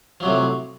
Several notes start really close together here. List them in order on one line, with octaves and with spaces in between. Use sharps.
F3 F#3 C3 A2